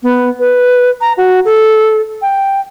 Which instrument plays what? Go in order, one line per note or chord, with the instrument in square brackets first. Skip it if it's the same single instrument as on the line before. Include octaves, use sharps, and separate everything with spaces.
[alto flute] B3
B4
A#5
F#4
A4
G5